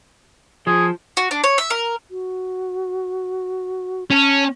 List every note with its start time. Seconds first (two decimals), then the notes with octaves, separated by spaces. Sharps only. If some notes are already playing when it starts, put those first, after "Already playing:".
0.67 F3 G#4
1.17 F#4
1.31 D4
1.44 C#5
1.58 E5
1.70 A#4
2.11 F#4
4.10 C#4 A5